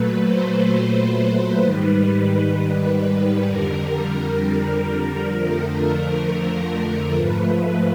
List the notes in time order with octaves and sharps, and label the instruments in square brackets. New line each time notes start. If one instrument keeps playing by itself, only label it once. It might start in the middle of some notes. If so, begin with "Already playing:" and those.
Already playing: [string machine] A#2 F#3 A3 B4
C5
B4
G#2 D#3 G3 B4
F2 D3 G3 A#4
F2 D3 F3 A3
G#2 F3 A3 B4